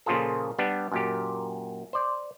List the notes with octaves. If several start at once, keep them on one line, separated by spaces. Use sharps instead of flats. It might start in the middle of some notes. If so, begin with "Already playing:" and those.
A#2 C#3 F3 F4 G#4 A4
G3 B3 D4
F#2 A#2 G4
C5 D5